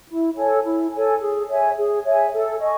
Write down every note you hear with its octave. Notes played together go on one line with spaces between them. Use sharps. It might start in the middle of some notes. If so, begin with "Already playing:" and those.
E4
A4 C#5 G#5
E4
A4 C#5 G#5
G#4
C#5 E5 G#5
G#4
C#5 E5 G#5
A4
D#5 G#5 C#6